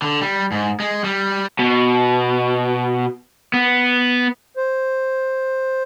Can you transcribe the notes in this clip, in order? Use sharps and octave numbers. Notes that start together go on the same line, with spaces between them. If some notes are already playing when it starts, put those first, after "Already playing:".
D3
G3
G#2
G#3
G3
B2
B3
C5